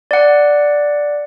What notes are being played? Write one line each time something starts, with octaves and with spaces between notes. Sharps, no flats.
D5 F#5